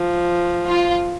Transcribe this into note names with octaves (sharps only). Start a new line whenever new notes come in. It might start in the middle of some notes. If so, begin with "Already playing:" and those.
Already playing: F3
F4